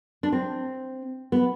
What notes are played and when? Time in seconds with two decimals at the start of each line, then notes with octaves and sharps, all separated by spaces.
0.23 D4
0.32 C4
1.32 B3